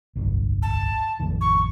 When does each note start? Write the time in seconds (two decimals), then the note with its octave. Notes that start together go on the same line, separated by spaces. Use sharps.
0.16 D1 G1 C2
0.62 A5
1.20 A1 F2 D#3
1.41 C#6